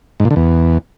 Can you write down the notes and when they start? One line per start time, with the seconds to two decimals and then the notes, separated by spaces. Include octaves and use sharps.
0.20 G#2
0.25 A#2
0.31 D3
0.36 E2